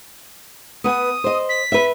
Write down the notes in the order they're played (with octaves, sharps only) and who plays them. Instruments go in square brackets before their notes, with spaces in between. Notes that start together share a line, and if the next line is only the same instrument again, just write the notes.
[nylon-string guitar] B3 B4 G#5 [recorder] D#6
[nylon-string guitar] C5 D#5
[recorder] B6
[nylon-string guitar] B4 E5